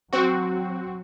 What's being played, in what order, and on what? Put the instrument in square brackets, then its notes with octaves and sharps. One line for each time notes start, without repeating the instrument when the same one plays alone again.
[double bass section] F#3 [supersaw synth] C4 F#4